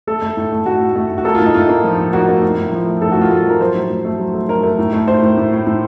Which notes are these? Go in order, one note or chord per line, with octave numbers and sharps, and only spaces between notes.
A3 A4
A3
A2
A3
A2 F#4
A2
A3
A2
F#4
A#3 A4
F4
A2
D#4
A2 F4
A#3
F3
A2
A#3 F#4
A#3
A2
A2
F3
A3
A2 A4
F#4
A2 F4
A2 F4
F3 A#4
F#3 C5
A2
A2
A3
F#3
A3
F#3 A#4
A3
A2
A3
A2 C5
A2
A2
A2
A2